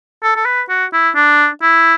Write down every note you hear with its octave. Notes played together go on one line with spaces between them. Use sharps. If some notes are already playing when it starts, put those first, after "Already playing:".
A4
A4
B4
F#4
E4
D4
E4